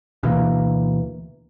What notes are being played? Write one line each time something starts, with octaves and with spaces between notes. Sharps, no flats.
D2 B2 E3 A#3